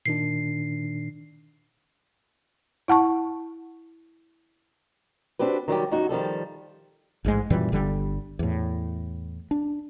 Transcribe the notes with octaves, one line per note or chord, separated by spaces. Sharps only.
A#2 D#3 D4 C7
E4 F#5 A5 C#6
C4 D4 F#4 G4 B4
D#3 F#3 G3 G4
F#2 D#4 F#4
D#3 F3 G3 A4
A1 G#2 B2 G#3
F#2 A#2 E3 G3
G1 D3 G3
E2 A2
D4